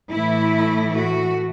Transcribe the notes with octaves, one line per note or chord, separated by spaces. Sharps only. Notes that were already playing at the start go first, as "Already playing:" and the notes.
A2 E3 A3 E4
F#4